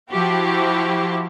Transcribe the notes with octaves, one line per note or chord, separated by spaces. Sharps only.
F3 E4 F#4 G4 C5